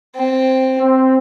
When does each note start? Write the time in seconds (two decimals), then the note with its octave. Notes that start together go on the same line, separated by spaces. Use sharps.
0.16 C4
0.80 C4